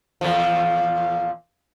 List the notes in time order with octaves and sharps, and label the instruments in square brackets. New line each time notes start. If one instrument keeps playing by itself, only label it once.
[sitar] E2 A#2 F3